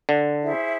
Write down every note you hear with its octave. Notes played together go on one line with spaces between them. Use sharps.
D3
E4 G#4 C5 E5